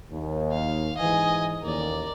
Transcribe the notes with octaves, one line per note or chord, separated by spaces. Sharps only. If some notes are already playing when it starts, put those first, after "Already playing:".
D#2
F5
G#2 E3 D#5 G#5
A1 D#2 A#4 D5